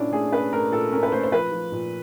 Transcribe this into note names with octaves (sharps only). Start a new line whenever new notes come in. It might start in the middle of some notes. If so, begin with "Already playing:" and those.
Already playing: A#2 C#4 D4 E4
A3 G#4
C#4 B4
A3 A#4
A#2 A4
C#4 A#4
B4
A3 C5
C5
F3 B4
F3
A#2